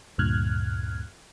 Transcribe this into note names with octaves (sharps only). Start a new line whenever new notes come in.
D2 G2 A#2 F6 F#6 G#6